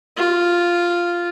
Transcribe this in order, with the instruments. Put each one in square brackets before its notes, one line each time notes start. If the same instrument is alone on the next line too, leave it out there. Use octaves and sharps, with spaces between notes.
[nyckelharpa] F4